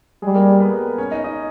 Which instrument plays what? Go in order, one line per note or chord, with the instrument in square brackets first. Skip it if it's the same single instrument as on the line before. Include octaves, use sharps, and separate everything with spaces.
[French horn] G3 [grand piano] G#3 G#4
[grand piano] A#3 A#4
B3 B4
C#4 C#5
D#4 D#5
D#4 D#5